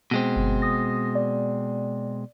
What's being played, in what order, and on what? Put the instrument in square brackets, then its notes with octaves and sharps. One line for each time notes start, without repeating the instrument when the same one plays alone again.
[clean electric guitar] B2 G#3 C4
[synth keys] G1
D#6 A#6
D5